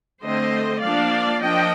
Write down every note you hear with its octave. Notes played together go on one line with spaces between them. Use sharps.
D3 A3 C4 C5 D#5
F3 A#3 D4 D5 F5
F3 A#3 D4 D#5 G5